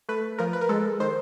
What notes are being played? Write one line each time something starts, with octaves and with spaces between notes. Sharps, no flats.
A3 B4
F3 A#4
B4
A#4
G#3 A4
D#3 C5